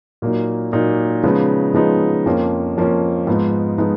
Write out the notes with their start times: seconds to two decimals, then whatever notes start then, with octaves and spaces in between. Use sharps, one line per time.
0.22 A#2 F#3 A#3 D#4
0.72 A#2 F#3 A#3 D#4
1.23 C#3 F3 G#3 B3 D#4
1.74 C#3 F3 G#3 B3 D#4
2.26 F2 F3 A#3 C#4
2.77 F2 F3 A#3 C#4
3.27 G#2 F3 G#3 B3 D#4
3.78 F3 G#3 B3 D#4